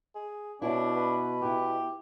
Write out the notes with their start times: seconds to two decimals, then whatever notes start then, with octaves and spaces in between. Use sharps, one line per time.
0.15 G#4
0.62 B2 C#4 D4 E4
0.96 B4
1.41 B3 E4 G4